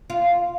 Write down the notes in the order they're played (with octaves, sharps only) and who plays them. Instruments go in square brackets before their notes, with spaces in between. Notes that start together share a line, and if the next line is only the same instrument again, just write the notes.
[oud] F4